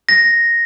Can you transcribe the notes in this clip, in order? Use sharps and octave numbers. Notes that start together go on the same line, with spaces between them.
A#6